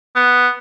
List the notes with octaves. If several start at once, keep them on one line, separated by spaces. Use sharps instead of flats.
B3